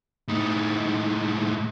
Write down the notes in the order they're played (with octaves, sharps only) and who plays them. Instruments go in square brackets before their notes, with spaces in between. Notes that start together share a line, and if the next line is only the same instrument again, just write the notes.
[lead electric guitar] A2 D#4